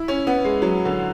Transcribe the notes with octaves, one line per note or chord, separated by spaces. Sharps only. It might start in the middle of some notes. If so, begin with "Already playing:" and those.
Already playing: E4
C#4
B3
G#3
F#3
D3